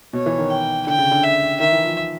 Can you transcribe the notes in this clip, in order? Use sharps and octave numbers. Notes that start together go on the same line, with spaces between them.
B2 C#5
E3
D#3
G5
D3 G5
C#3
D3
E5
D#3 E5
E3
F3